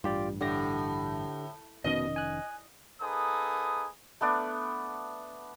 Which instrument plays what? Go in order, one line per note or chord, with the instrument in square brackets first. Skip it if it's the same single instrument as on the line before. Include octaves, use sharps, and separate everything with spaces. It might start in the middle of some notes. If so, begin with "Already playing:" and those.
[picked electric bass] A1 G2 [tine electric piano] F4 G4 D5
[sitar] A2 [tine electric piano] D3 G4 A#6
[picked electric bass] F1 D#3 C#4 [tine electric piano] B2 [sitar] D#5
[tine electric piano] G#5 F#6
[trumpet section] A#3 D#4 G#4 A4 B4 D#6
[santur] A3 B3 D4 D5